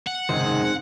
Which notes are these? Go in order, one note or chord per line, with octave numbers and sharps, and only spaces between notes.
F#5
F#1 G#2 C3 D#3 G#3 C4 D#4 C5